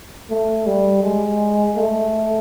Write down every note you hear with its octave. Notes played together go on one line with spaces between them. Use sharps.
A3
G3
G#3
A3